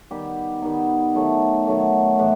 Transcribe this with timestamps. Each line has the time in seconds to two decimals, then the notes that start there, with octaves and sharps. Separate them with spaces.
0.11 D#3 G3 B3 D#4 G4
0.62 D#3 G3 B3 D#4
1.15 D#3 F#3 A3
1.67 D#3 F#3 A3
2.19 A2 E3